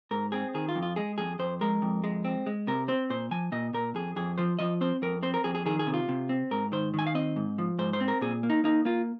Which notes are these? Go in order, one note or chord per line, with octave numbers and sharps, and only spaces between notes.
G#2 A#4
C4 G#4
D#3 G#4
F4
F2
F4
G#3 G#4
F2 G#4
F2 C5
G#3 A#4
F2
G#3
C4
G#3
C3 A#4
C4 C5
A#2 C5
F3 G#5
A#2 D#5
A#2 A#4
F2 G#4
F2 G#4
F3 C5
F3 D#5
C4 C5
F2 A#4
C4 C5
A#4
F2 G#4
G#4
D#3 G#4
G#4
C3
F4
C3
C4
G#2 A#4
D#3 C5
D#3 G#5
F5
C4 D#5
G#2
F3
G#2 C5
C5
C4
A#4
A#2 G#4
A#3
D#4
A#3 D#4
A#3 F4